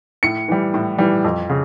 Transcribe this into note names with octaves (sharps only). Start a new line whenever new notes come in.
A2 C#7
E3 G3
A2
E3 G3
F2
C#3